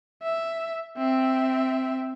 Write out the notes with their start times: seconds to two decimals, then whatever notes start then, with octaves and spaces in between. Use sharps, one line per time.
0.23 E5
0.97 C4 E5